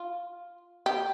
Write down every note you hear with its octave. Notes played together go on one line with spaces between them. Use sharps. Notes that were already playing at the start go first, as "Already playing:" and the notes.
Already playing: F4
G4